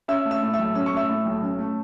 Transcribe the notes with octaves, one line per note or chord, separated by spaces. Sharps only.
C#4 E5 E6
A3
E5 E6
A2
E5 E6
B1
C#4 E6
C#6
A3 E5 E6
A2
B1
C#4
A3